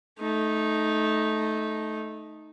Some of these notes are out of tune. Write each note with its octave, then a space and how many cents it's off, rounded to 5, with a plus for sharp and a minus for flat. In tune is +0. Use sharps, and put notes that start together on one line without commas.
A3 -15 D#4 +0